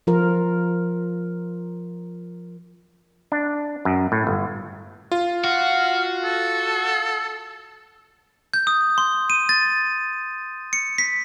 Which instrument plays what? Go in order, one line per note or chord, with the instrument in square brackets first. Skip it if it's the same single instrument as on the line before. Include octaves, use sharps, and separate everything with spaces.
[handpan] F3 F4 A#4
[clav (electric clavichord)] D4
F#2
A2
G1
[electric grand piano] F4
[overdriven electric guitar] F#4 [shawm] F5
[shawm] A4
[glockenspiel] G6
D#6
C6
D#7
A6
C#7
B6